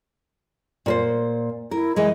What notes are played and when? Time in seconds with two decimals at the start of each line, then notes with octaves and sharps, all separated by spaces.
0.86 A#2 B4 C5
1.71 E4 A#4
1.96 E3 G#3 D#5